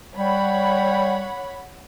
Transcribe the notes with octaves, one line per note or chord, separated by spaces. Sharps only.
G3 C#5 F#5 B5